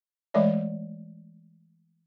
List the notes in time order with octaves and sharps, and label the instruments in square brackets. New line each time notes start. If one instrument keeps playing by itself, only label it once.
[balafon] E3 G#3 A3 C#5 D5 E5